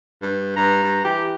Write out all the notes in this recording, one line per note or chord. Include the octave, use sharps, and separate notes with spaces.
G2
G2 A#5
G2
E3 G4